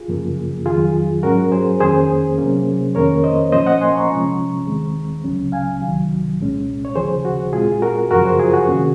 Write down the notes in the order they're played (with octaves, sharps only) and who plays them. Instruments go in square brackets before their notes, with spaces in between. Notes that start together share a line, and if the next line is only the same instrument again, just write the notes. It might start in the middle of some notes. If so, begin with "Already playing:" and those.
Already playing: [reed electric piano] F4 G#4
F#2 C#3 F3 A#3
F2 D#3 F#3 F4 G#4
G#2 F#3 C#4 F#4 A#4
G#4 C5
F2 D#3 A#3 C#4 G#4 C5
C3 F#3 A#3 C#4
F2 D#3 A#3 C#4 A#4 C#5
C5 D#5
A#2 F3 A#3 C#4 C5 D#5
D#5 F#5
G#5 C6
A#5 C#6
C3 F3 G#3 C#4
D#2 D#3 G#3 C4
C#2 C#3 F#3 C#4
F5 G#5
C2 C3 D#3 F#3
C2 A#2 G#3 C#4
C#5
D#2 C#3 F3 G#4 C5
F#4
A#2 G#3 C4 F4 G#4
F#4 A#4
F#2 C#3 F3 F#4 A#4
G#4 C5
F4 G#4
F#4
C3 D#3 A#3 C#4